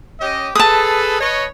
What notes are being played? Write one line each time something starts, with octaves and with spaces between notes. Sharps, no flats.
C#4 G4 D#5
G#4 A4 B4 A5 D#6
B4 C#5 D#5